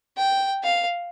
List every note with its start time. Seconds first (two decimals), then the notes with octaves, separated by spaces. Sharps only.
0.18 G5
0.64 F5